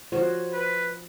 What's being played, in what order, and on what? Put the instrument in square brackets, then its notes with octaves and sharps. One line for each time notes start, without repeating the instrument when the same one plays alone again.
[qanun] F3 F#4 C#5 [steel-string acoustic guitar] C5
[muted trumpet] B4